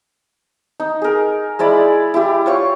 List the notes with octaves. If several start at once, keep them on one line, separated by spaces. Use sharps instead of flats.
D#4
G#4 A#4
G#3 E4 D5 B5
E4 G4
F4 C#5 C#6